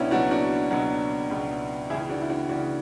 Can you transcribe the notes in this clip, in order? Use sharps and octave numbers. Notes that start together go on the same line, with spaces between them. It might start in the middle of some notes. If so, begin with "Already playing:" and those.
Already playing: C#2 B2 F#3 B3 C#4 D4 E4
C#2 B2 F#3 D4 F#4
D4 F#4
C#2 B2 F#3 D4 F#4
C#2 B2 F#3
C#2 C#3 E3 E4 G#4
D4 F#4
E4
D4 F#4
C#2 C#3 E3 D4 F#4